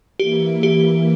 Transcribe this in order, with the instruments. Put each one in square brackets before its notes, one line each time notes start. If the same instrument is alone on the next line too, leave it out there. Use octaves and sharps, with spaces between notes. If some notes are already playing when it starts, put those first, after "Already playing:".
[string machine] E3 A#3 E4 [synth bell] G4
[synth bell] G4